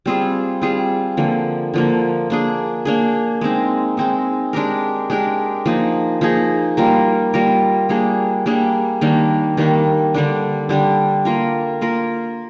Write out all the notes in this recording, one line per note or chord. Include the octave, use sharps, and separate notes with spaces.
G3 C4 F4 G#4
G3 C4 F4 G#4
D3 F3 A#3
D3 F3 A#3
A#3 D4 G#4
A#3 D4 G#4
G#3 C4 D#4
G#3 C4 D#4
G#3 D4 G4 A#4
G#3 D4 G4 A#4
F3 A#3 D#4 G#4
F3 A#3 D#4 G#4
G3 A#3 F4 A#4
G3 A#3 F4 A#4
G3 A#3 D4 G#4
G3 A#3 D4 G#4
D#3 G3 A#3 D4
D#3 G3 A#3 D4
D3 G3 D4
D3 G3 D4
A#3 F4 A#4
A#3 F4 A#4